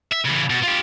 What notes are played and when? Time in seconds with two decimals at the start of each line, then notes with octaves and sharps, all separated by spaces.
0.12 E5
0.25 C#3 E3
0.50 B2
0.63 F4 G4